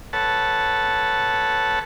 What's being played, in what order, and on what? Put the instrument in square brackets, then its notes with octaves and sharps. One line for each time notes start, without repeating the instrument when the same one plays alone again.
[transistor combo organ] A4 B4 C#5 F#5 A5